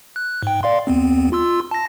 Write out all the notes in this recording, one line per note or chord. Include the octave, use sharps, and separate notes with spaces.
F#6
G#2 G5
D5 F5 C6
D#2 B3 C4
F4 C6 E6
A5 A#6